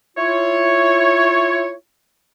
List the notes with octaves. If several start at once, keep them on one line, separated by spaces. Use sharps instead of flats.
E4 F4 C#5